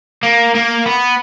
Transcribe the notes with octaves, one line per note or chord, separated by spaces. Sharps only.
A#3
A#3
B3